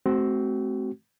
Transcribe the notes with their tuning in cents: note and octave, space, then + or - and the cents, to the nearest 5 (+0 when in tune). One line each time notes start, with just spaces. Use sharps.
A3 -30 C4 +0 F#4 +25